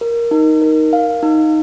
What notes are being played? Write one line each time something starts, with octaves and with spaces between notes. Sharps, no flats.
A#4
D#4
A#4
F5
D#4